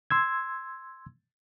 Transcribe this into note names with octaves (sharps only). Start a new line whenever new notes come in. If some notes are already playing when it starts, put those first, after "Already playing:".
C6 E6 G#6